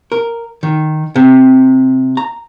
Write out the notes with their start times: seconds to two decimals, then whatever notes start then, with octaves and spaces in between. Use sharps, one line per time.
0.12 A#4
0.63 D#3
1.16 C3
2.17 A#5